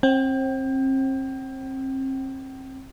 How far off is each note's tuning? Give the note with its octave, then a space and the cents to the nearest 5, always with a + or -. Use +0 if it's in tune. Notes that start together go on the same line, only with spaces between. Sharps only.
C4 +35 G5 -35